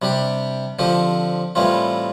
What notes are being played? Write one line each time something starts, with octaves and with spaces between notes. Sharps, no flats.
C3 G3 D4 G4
D3 F3 C4 G4
A2 E3 G3 C4 F4